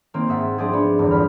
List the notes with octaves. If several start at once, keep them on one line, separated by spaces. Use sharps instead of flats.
D#3 A#3 C4
G#2 G#4 E5 F#5 A6
F3 C4 D4 G#4
B3 D4
G1 E2 G2
F3 B5 F6